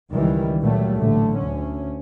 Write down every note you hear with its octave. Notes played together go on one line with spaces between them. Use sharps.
C#2 D#3 E3 G3
A#2 F#3 G3 A3
A1 D3 A3
D2 C#4